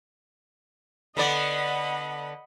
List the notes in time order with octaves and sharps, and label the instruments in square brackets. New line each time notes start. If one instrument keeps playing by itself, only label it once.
[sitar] D3 B3 D5 [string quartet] D#5 F#5 B5